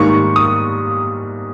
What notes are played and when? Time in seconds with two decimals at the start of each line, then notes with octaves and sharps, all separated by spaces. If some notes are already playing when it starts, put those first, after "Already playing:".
Already playing: G#2 D#3 G3 A#3 C#6
0.36 D#6